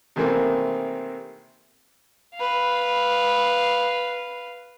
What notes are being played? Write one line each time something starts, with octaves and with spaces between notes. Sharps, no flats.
C3 D#3 E3 A3 A#3 C4
B4 F5